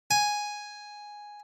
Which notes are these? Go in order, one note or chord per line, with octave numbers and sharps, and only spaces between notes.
G#5